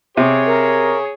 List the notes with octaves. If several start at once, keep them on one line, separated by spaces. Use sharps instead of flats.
C3 G#4 C#5
A#4